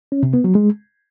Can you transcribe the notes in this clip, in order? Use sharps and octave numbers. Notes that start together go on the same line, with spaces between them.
C#4
C3
B3
F#3
G#3